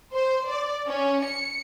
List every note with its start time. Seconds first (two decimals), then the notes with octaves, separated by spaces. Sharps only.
0.13 C5
0.48 D5
0.87 C#4
1.23 C#7